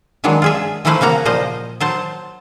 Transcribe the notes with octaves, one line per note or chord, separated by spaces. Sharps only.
D#3 E3 F#3 G#3 D4
F4 G#4 E5
E3 F3 A3 E4 B4 C5
C#3 A#3 F#4 A#5
A#2 F3 C5 D#5
F#3 C5 A5